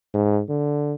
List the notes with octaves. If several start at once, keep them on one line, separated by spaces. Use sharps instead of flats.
G#2
D3